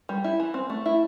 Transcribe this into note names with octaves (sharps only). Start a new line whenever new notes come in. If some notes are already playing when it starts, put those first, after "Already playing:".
G3
E4
E3
C4
A3
E4